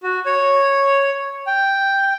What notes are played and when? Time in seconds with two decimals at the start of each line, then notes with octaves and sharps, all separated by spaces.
0.03 F#4
0.26 C#5
1.47 G5